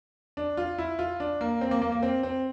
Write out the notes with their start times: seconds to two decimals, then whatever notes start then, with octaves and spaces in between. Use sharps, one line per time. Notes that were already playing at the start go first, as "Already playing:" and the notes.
0.37 D4
0.57 F4
0.78 E4
0.99 F4
1.20 D4
1.41 A#3
1.61 C4
1.71 A#3
1.82 A#3
1.92 A#3
2.03 C4
2.23 C4